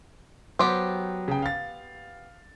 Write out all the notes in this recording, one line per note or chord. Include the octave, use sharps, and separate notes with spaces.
F#3 B3 G4 C5
C#3 G5
F5 A6